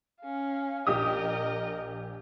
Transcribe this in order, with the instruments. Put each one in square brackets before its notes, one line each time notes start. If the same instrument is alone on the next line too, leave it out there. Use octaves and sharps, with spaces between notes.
[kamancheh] C#4 F5
[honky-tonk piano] A#1 G4 D#6 [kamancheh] A#4 D#5